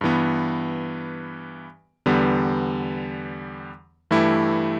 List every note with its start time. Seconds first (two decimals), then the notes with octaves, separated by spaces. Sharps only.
0.01 G2 E3 B3
2.06 E2 D3 G3 B3
4.11 G2 E3 A3 E4 G4